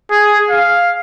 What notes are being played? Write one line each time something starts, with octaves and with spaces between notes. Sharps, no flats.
G#4
F5